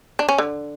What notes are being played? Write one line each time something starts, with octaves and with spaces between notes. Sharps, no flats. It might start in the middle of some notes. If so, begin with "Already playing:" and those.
D4
C#4
D3